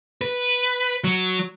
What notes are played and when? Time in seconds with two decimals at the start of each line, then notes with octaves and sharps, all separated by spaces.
0.21 B4
1.04 F#3